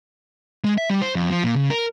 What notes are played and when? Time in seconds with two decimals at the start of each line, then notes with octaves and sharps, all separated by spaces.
0.64 G#3
0.78 E5
0.90 G3
1.02 C5
1.15 F2
1.30 F3
1.44 A#2
1.56 C#3
1.70 A#4